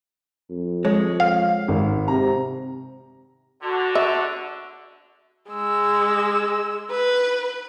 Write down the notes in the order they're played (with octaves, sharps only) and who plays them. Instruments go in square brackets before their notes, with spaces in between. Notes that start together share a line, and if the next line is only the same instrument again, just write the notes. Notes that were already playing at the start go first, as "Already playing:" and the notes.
[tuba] F2
[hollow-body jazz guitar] G#3 [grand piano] C#5
[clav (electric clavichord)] F5
[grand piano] G#1
[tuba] C3 [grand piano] A#5
[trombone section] D3 [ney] F#4
[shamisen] E5
[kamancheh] G#3 E6
B4